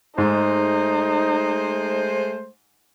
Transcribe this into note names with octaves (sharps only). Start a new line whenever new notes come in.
G#2 G#3 A3 D#4 C5